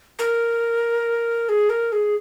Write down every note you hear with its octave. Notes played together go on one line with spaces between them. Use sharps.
A#4
G#4
A#4
G#4